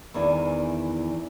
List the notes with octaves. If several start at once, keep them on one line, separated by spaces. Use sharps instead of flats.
E2 D#3 E3 E4 D5 G#5